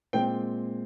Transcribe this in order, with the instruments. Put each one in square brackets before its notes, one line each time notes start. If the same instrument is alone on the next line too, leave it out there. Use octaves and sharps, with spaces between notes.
[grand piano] A#2 G#3 C4 G5